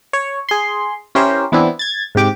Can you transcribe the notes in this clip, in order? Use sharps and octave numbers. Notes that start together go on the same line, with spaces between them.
C#5
G#4 C6
C#4 E4 G4 A#4 C5
E3 B3 C4 D4 E4
G#6 A6
G#2 C3 G4 D6